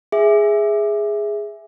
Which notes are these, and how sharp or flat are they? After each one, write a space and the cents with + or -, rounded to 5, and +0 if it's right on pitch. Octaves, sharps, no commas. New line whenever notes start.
G#4 -5 E5 +0